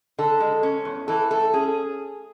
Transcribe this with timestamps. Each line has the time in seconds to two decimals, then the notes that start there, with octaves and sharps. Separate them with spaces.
0.18 D3 A4
0.40 G#3
0.63 C#4
0.85 E2
1.08 E3 A4
1.31 A3 A4
1.54 C#4 G#4